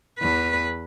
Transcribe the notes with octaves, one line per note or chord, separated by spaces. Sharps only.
E2 B4